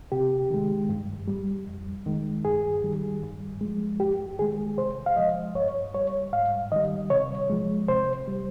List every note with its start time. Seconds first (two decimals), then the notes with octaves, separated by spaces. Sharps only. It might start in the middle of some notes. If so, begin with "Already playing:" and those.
0.12 C3 G4
0.51 D#3 G#3
0.89 G2
1.28 G3
1.67 F2
2.06 D#3 G#3
2.45 G2 G#4
2.83 D#3 G3
3.22 G2
3.61 F3 G#3
4.00 G2 G4
4.39 D#3 G#3 G#4
4.78 C3 C5
5.06 F5
5.16 F3 G#3 D#5
5.55 G2 C#5
5.94 G3 C#5
6.33 G#2 F5
6.72 D#3 G3 D#5
7.10 C3 C#5
7.50 F3 G#3
7.88 C3 C5
8.28 G3